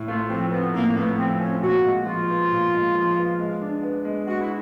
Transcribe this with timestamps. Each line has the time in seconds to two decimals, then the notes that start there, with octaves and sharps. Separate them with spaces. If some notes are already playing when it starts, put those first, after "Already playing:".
Already playing: A2
0.08 A3 F4
0.30 F3 C4
0.52 B3 C4
0.74 A2 A#3
0.96 A3 B3
1.18 F3 C4
1.40 C4 C#4
1.62 A#2 F#4
1.84 G#3
2.06 F3 F4
2.29 B3
2.51 A#2
2.72 G#3
2.95 F3
3.17 B3
3.39 G#3
3.62 D4
3.83 B3
4.05 G#3
4.27 G#3 F#4
4.41 E4